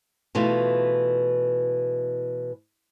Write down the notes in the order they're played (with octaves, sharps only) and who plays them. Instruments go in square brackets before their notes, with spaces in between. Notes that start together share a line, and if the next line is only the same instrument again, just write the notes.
[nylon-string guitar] B2 E3 A3 F4